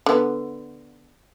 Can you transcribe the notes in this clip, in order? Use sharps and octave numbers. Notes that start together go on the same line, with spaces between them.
D3 B3